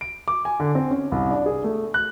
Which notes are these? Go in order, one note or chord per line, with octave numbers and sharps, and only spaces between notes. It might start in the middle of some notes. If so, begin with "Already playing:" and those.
D7
D6
G#5
D3
C4
C#4
C2
D4
G#4
A3
F#6